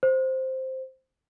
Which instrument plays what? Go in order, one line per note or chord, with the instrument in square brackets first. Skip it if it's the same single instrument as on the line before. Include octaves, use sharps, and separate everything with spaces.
[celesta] C5